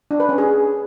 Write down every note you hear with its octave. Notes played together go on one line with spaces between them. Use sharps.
D4
B4
C#4
G#4